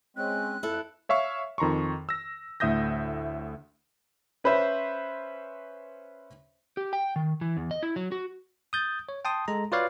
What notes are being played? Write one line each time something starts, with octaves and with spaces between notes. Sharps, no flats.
G#3 C4 C#4 F#6
F2 E4 A4
C#5 E5 F5 C#6
F2 D#3 A#5 C6 C#6
E6 A#6
D2 A2 E5 D#6 G6 A#6
C#4 B4 C5 E5
G4
G5
D#3
E3
E2
D#5
E4
F#3
F#4
D#6 G6 A6
C#5
G5 A5 C6 D#6
G#3 A4 A#5
F4 F#4 B4 C#5 D5 F5